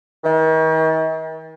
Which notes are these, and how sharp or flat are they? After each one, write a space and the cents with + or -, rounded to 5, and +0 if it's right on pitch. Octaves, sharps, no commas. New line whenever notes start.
D#3 +45